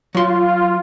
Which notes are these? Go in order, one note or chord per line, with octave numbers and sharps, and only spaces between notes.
F#3 F4 C6